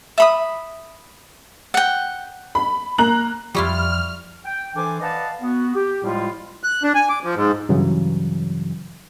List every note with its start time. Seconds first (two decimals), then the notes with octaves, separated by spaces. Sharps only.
0.18 E5 B5 D#6
1.74 F#5 G5
2.55 B5
2.98 A#3 A#5 F#6 F#7
3.55 F2 F3 G3 E4 F4 G4 C#6 F6
4.44 G5
4.75 E3 D4 A4 C5 G#5 D6
5.01 B4 D5 D#5 F5 F#5 A5
5.41 B3 F#4
5.74 G4
6.03 A2 F3 G3 G#3 E4 F4
6.64 F#6
6.83 D4
6.95 G#5
7.09 D6
7.24 F3
7.35 G#2
7.69 G2 C#3 E3 F#3